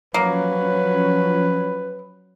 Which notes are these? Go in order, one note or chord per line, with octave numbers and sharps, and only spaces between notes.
F3 F#3 A#3 C#4 B4